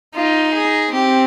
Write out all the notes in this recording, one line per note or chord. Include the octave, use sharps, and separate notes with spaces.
D#4 F4
G#4
C4 G4